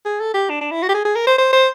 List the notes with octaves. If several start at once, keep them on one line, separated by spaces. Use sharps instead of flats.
G#4
A4
G4
D4
D4
E4
F#4
G4
G#4
G#4
A#4
C5
C5
C5